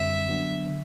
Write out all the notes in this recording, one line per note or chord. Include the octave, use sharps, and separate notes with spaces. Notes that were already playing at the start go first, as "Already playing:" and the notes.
Already playing: F#2 D3 G3 C4 E5
D3 F#3 B3 D4
D3